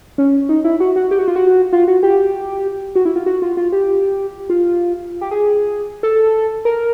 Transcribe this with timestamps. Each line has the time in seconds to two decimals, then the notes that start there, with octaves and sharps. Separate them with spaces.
0.18 C#4
0.49 D#4
0.64 E4
0.80 F#4
0.96 F#4
1.11 G4
1.19 F#4
1.28 F4
1.36 F#4
1.73 F4
1.88 F#4
2.03 G4
2.95 F#4
3.05 E4
3.16 F4
3.26 F#4
3.42 F4
3.57 F4
3.72 G4
4.50 F4
5.21 G4
5.31 G#4
6.03 A4
6.65 A#4